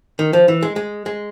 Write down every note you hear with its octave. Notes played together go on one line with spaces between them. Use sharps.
D#3
F3
E3
G#3
G#3
G#3